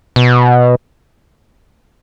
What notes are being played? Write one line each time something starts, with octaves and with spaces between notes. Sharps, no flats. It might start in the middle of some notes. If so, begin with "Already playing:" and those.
B2